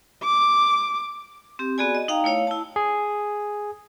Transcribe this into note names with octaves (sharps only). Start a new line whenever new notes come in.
D6
C4 G4
B3 F#4 G#4 D5 G#5
D#5
D#4 F5 G5 A#5
A3 E4 C#5 F5
E4 A5
G#4